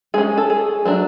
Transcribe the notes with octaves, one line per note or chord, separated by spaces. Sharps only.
G#3 C#4 G#4
A4
G#4
F#3 A3 D4